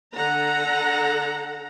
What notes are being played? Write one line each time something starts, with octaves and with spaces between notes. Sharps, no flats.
D3 A4 F#5 A#5